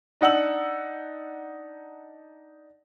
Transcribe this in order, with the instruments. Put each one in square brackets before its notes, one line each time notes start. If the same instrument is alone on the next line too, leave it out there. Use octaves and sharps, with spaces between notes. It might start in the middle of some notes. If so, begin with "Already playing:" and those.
[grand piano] D4 D#4 F#5 E6 F#7